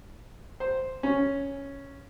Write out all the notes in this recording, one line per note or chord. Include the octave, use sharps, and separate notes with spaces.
C5
C#4